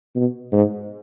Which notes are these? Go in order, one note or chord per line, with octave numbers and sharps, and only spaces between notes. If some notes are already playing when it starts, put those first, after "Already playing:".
B2
G#2